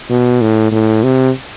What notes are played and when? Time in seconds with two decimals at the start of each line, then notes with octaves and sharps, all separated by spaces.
0.10 B2
0.41 A2
0.72 A2
1.03 C3